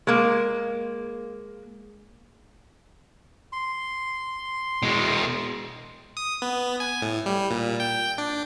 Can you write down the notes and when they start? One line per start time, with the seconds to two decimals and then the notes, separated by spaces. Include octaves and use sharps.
0.07 G#3 A#3
3.53 C6
4.82 B2 G#3
6.17 D#6
6.42 B3
6.80 G#5
7.02 A2
7.26 G3
7.51 A#2
7.80 G5
8.18 D4